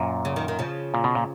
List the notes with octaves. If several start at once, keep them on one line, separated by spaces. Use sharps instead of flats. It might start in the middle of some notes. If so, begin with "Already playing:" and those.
Already playing: F#2 A#2
C#3
D#3
D#3
C#3 F3
A#2
B2
A#2